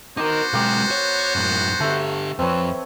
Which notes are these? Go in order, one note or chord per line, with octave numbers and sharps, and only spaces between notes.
B3 D#4 F#4 A#4 C5 D6
B1 G#3 A#4 G5 D6
C#5
F#2 A2
D3 A3 G4
F2 F3 C4 B4 C#5